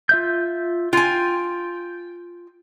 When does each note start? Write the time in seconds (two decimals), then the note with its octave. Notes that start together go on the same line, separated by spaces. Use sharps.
0.09 F4 E5 G6
0.93 F4 G5 G#5